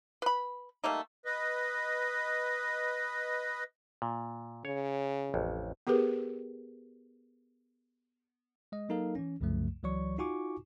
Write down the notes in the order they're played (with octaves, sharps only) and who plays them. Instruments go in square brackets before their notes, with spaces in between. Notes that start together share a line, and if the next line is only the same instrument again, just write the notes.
[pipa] B4 B5
G3 A3 A#3 D#4
[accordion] B4 D#5
[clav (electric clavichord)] A#2
[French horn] C#3 [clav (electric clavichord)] C#5
[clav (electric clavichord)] A1 F2
[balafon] B3 G4 G#4 A#4 B4
[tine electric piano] G#3 D#5
F#3 A#3 D#4 A4 A#4 F5
E3 C#4
C2 F#2 C#3 F3 A3
C#2 E3 F#3 C#5 D5 C#6
D#4 F4 F#4 G#5 C#6 D6